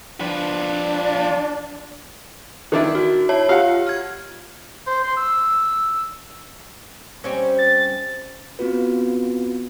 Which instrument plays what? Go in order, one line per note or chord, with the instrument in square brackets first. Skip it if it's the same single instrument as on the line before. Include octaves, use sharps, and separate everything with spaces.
[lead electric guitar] F3 B4 [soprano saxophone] D4
[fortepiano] D#3 D4 E4
[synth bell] F#4
[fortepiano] E4 [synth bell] C#5 A5
[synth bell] F4 G4 [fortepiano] F5 F#5
[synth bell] F6 G#6
[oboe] C5
C6
E6
[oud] G3 C4 C#4
[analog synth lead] A6
[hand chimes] B3 C4 F4 F#4 B4